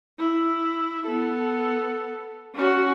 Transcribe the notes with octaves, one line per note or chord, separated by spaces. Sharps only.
E4
B3 A4
C#4 F#4